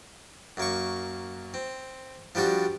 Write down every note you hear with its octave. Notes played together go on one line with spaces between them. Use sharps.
F#2 A#3 C#6
C4
F3 G3 D4 F#4 G4